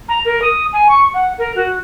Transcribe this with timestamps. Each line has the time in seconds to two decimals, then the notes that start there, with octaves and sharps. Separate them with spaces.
0.08 A#5
0.25 A#4
0.41 D#6
0.72 G#5
0.88 C#6
1.14 F#5
1.38 A#4
1.55 F#4